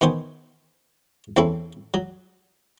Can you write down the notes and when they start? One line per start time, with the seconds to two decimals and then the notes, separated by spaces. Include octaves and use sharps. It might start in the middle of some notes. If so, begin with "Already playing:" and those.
0.01 B2 D#3 B3 C5 G#5
1.37 E2 C4 C#4 E4 A4
1.94 F#3